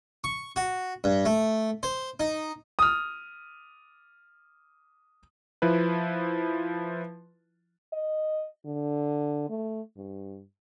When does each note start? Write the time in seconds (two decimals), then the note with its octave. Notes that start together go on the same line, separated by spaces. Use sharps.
0.24 C#6
0.56 F#4
1.04 G2
1.25 A3
1.83 C5
2.20 D#4
2.79 D#6 F6
5.62 F3 E4 B4
7.93 D#5
8.66 D3
9.50 A3
9.97 G2